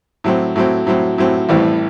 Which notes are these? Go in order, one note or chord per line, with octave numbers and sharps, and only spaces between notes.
A2 F#3 C4
A2 F#3 C4
A2 F#3 C4
A2 F#3 C4
A1 A2 E3 G3 C4